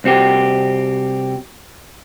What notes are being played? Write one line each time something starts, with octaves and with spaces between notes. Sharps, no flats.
C2 C4 F#4 G4